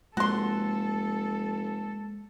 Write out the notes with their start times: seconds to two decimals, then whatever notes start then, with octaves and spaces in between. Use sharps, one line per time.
0.17 F1 G#3 A#3 F#4 A4 C6